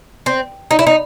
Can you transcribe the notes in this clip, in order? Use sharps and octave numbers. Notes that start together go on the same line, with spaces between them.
C4
D#4
E4
D#4